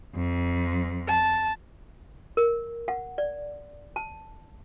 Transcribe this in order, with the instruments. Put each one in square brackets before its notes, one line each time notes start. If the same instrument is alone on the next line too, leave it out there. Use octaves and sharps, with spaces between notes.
[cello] F2
[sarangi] A5
[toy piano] A#4
F#5
D5
A5